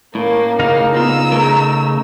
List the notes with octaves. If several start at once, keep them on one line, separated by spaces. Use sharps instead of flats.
A2 A#3 C#4
C#3 A#3 D#4 F5
B3 F4 A#5 E6
A3 G#4 A#4